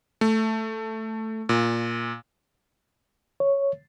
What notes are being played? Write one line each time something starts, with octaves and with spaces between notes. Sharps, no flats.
A3
A#2
C#5